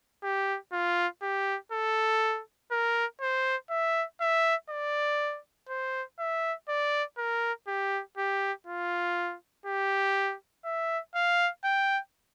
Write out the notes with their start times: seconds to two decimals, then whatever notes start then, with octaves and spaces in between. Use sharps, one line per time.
0.23 G4
0.72 F4
1.22 G4
1.72 A4
2.71 A#4
3.21 C5
3.70 E5
4.21 E5
4.70 D5
5.69 C5
6.19 E5
6.69 D5
7.18 A#4
7.68 G4
8.18 G4
8.67 F4
9.66 G4
10.65 E5
11.15 F5
11.64 G5